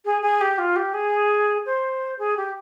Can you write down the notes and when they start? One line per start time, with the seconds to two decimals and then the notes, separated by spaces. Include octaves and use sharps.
0.05 G#4
0.22 G#4
0.41 G4
0.59 F4
0.76 G4
0.94 G#4
1.66 C5
2.19 G#4
2.37 G4